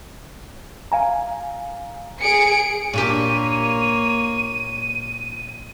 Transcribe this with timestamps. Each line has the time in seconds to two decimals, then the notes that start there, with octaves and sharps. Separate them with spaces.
0.92 F5 G#5 A#5
2.21 G#4 C#7 D7
2.93 A#2 A#3 D4 G4 C#5 D#7